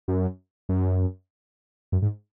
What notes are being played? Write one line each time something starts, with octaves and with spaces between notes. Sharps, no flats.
F#2
F#2
F#2
G#2